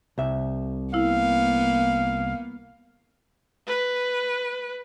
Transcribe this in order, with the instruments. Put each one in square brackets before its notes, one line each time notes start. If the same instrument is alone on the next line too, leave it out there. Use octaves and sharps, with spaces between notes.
[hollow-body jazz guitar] C2 E5
[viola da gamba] A#3 B3 [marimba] E4 [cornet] F5
[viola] B4